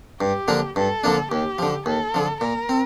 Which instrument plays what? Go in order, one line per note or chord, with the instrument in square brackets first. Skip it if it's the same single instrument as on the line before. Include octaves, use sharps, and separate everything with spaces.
[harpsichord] G2 [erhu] G4
[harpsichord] D3 F3 A#3 D4
[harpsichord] G2 [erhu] A4
[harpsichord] D3 F3 A#3 D4
[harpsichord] D#2 [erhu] G4
[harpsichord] D3 F3
[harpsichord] D#2 [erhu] A4
[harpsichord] D3 F3
[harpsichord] A#2 [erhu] A#4
[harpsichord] C4